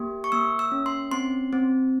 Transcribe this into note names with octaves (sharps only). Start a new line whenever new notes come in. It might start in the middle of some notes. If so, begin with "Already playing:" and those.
Already playing: A#3 G4
C#6
A#3 E6
E6
C#4
C6
C4 C6
C4